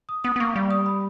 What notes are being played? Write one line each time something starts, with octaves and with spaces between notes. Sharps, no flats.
D#6
B3 D#6
B3
A#3 C#6
G3
D#6
B5